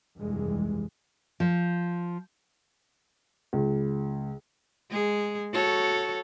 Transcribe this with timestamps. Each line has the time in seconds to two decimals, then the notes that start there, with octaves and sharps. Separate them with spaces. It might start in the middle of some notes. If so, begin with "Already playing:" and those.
0.17 F1 C2 G2 E3 G#3
1.40 F3
3.53 C#2
4.90 G#3 G#4
5.53 F#4 A4 C#5